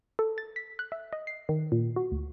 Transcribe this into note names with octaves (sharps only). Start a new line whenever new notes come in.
A4
A6
B6
F#6
E5
D#5
C7
D#3
A#2
F#4
D2